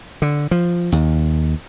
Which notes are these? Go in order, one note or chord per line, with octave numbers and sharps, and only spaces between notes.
D3
F3
D#2